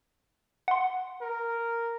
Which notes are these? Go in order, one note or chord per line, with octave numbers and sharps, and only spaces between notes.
F#5 C6
A#4